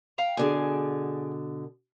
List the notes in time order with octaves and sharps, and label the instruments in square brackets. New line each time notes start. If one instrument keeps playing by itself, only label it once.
[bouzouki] F5 G5 A#5
[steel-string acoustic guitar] B2 D3 [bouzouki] G#4 D5 G#5